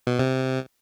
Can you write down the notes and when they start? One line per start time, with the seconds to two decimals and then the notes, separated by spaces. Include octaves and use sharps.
0.07 B2
0.19 C3